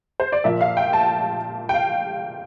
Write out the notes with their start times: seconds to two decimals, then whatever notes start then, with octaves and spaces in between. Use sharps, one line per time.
0.20 C5
0.32 D5
0.44 A#2 F3 A#3 E5
0.61 F5
0.77 G5
0.93 A5
1.69 G5
1.74 F5